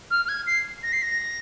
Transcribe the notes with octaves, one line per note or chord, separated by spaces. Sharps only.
F6
F6
G#6
C7
A#6
C7
A#6